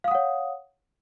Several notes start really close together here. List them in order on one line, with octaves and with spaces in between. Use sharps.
F5 D#6 F#5 C#5